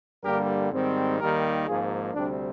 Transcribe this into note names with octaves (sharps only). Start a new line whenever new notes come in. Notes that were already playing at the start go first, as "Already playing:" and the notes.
G2 D3 G3 A#3 G4 A#4
G#2 D#3 G3 C4
D#2 D#3 G3 A#3 G4 A#4
G#1 G#2 F3 A#3 F4 G#4
D2 C3 G3 C4 D4